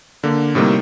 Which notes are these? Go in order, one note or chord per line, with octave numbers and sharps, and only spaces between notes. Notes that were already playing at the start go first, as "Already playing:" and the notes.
D3 A#3
A2 C3 G3 A#3 D#4